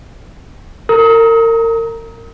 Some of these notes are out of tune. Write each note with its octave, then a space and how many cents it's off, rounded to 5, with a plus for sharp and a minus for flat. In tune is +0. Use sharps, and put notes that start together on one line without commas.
A#4 -35 A#5 +0 D#6 +35